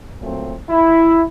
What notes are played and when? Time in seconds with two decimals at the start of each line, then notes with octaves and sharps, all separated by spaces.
0.18 A#2 F#3 A3 C4
0.70 E4